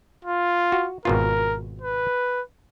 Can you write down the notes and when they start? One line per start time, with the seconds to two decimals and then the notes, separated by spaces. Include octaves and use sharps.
0.25 F4
0.72 F#4
1.05 G#1 B2 F4 A#4
1.81 B4